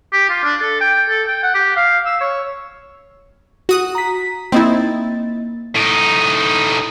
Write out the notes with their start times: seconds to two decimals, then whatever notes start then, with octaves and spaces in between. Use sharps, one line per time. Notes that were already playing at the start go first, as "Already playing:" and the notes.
0.13 G4
0.30 F4
0.44 D4
0.62 A4
0.81 G5
1.09 A4
1.27 G5
1.43 F#5
1.55 G4
1.76 F5
2.06 E6
2.21 C#5
3.69 F#4 D#6 F#6
3.95 A#5 B6
4.52 A#3 C4 D#4 E4 D#5 A6
5.76 A2 D#4